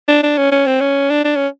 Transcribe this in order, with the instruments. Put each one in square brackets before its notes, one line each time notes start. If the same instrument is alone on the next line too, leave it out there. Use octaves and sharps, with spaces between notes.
[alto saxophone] D4
D4
C#4
C#4
C4
C#4
D4
D4
C#4